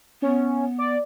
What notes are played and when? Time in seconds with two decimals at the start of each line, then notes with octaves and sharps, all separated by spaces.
0.22 B3 C#4
0.78 D5